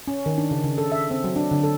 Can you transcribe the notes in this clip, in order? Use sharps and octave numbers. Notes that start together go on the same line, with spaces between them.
C#4
D#3
D4
C#3
C#3
A4
E5
C4
F#3
D4
D3
A4